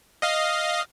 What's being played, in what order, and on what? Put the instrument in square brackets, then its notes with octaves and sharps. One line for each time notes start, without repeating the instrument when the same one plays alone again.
[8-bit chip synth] D#5 F5